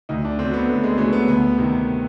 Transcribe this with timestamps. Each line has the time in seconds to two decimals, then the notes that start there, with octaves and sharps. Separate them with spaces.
0.09 D2 D#4
0.25 D4
0.38 D3 C4
0.43 F#3
0.53 B3
0.68 D2 A3
0.84 G#3
0.98 D3 F#3 A3
1.13 B3
1.28 D2 B3
1.58 C3 D#3